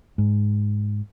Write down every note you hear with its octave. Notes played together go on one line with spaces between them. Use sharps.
G#2